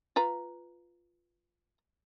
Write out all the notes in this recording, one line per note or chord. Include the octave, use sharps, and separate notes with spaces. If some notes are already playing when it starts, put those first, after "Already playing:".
F4 B4 A#5